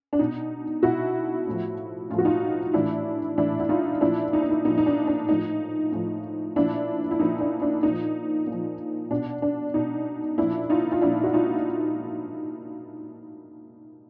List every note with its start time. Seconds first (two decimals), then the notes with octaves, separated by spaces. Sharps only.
0.13 D4
0.19 B2 D#4
0.82 B2 E4 F#4
1.47 A2 F3
2.10 A2 F4
2.14 F3 F#4
2.25 D#4 F4
2.74 A2 E3 D4 E4
3.38 A2 E3 D4 E4
3.60 E4
3.69 D#4 F4
4.01 A#2 F3 D4 E4
4.33 D#4
4.41 D4
4.49 D#4
4.65 A#2 F3 D#4
4.78 D#4
4.86 D4
5.07 D4
5.28 A2 F3 D#4
5.92 A2 F3
6.56 A#2 F3 D4 E4
7.11 E4
7.19 A#2 F3 D#4
7.40 D4
7.62 D4
7.83 A#2 D#4
7.88 F3
8.47 A#2 F3
9.10 B2 D4
9.42 D4
9.74 B2 D#4
10.38 A#2 F3 D4 E4
10.70 D#4 F4
10.92 F4
11.01 A#2 F3 D4 E4
11.24 F#4
11.33 D#4 F4